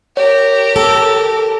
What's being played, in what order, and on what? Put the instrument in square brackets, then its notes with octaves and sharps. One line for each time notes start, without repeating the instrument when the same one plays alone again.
[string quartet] G4 A#4 [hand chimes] C#5
[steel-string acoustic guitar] A4